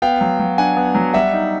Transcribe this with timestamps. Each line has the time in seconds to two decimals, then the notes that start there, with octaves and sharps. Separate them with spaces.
0.02 B3 F5 G5
0.21 F#3
0.39 F#3
0.58 D4 F#5 G#5
0.77 B3
0.95 F#3
1.14 G3 E5 F#5
1.33 D#4